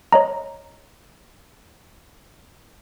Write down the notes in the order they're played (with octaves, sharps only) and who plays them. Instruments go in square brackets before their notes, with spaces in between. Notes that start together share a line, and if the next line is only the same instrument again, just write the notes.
[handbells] C#5 D#5 A#5